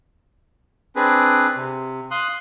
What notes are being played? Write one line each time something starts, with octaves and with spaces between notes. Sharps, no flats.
C4 D4 G#4 B4
C3
F5 C6 D#6 F#6